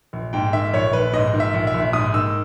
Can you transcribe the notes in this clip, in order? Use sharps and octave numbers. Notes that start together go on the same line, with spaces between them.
A#1
G#2 G5
D#3 E5
A#1 C#5
A#1 B4
G#2 D#5
D#3
E5
A#1
E5
A#1
G#2 D#6
D#3 E6